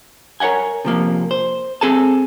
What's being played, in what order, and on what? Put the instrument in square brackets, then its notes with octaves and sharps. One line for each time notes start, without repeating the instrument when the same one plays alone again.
[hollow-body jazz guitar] A#4 C#5 D#5 F#5 G#5
C3 F3 A#3
C5
C4 G#4 A4 G#5 A5